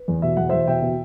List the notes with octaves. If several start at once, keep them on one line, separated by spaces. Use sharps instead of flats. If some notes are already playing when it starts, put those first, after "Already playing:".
Already playing: B4
E2
B2 E5
E2 F#5
E2 C5 E5
B2 E5 G5
B2